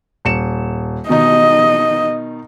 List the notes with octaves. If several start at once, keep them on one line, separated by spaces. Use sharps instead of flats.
D#1 C#7 E7
B2 D#3 D#4 D#5